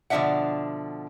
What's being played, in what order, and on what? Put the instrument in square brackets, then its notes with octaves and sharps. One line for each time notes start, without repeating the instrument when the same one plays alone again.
[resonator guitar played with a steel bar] B2 D3 F3 D4 E5 F#5